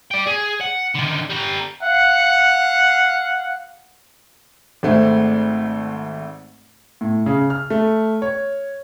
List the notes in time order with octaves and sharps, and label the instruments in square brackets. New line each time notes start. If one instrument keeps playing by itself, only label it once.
[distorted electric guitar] D5 G5
G#4
F#5
D3 D#3
G3 A#5
[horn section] F5 F#5
[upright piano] G#1 G#2 A3 C4
[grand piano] A2
C#3
F6
A3
C#5